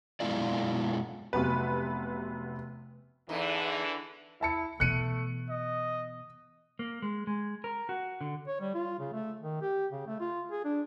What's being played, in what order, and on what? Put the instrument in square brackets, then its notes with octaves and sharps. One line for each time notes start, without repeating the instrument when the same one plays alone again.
[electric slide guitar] F#2 B2 G#3 E4 F4 D5
[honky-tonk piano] F1 C3 F#3 B3 B4
[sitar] E2 D#4 [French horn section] D3 E3
[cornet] E4 [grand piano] E5 A5 C#7
[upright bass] B2 E3 [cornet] A3 [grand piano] F#6 C#7 D#7
[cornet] D#5
[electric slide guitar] A#3
G#3
G#3
A#4
F#4
D3
[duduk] C#5
G3
F4
C#3
A3
D#3
G4
C#3
A3
F4
G#4
D4